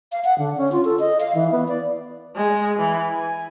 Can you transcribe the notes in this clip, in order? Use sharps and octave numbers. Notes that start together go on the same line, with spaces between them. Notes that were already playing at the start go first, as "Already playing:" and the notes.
F5
F#5
D3
C#4
F4
A4
D#5
F5
E3
B3
D5
G#3
E3
G#5